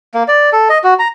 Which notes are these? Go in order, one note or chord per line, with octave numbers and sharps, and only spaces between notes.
A#3
D5
A4
D#5
F#4
A#5